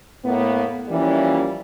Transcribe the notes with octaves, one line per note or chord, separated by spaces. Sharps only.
A2 A#3 B3
E3 F3 G3 A#3 C#4